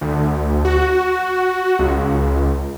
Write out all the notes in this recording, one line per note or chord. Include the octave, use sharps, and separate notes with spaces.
D2
F#4
C#2